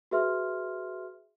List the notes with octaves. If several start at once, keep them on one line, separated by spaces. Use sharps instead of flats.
F#4 G#4 B4 E5 C6 F6